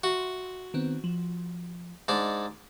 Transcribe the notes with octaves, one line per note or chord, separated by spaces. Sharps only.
F#4 E5 C6
D#3 B3 C4
F3
G#2 D4 D#5